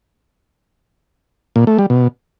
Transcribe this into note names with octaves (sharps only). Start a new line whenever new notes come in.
A#2
A3
G3
B2